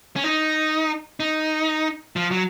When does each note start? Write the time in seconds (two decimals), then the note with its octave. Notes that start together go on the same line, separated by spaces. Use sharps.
0.16 C#4
0.24 D#4
1.20 D#4
2.16 F3
2.31 F#3